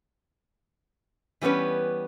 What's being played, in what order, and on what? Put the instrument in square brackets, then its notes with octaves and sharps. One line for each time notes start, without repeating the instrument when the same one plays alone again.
[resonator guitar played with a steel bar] E3 G3 B3 C#4 B4